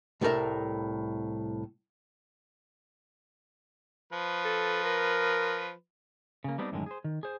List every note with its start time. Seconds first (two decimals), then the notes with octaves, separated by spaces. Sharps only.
0.21 C2 A2 A4 A#4 E5
4.12 F3 B4
4.45 A4
4.84 A#4
6.44 C#3 A#3
6.58 G3 A3 B3 C4 D4 D#4
6.72 F#2 A2 D3 D#3 F3 G#3
6.86 G#4 C5
7.04 D#3
7.23 G#4 C5